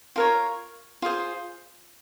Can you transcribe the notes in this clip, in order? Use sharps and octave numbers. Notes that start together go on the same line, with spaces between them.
F4 A#4 C#5
F4 G#4 C5